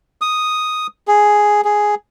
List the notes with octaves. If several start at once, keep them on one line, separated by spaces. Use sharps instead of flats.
D#6
G#4
G#4